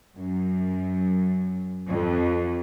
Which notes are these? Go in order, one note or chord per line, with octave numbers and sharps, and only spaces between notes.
F#2
F2